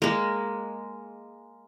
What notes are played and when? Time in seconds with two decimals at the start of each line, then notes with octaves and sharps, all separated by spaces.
0.02 G#3 A#3